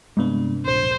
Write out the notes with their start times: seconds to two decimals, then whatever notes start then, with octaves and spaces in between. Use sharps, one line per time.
0.17 G2 C3 G#3 B3 D4
0.66 D1 A#1 C5